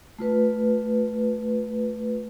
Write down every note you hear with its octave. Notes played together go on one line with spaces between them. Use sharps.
A3 F4 B4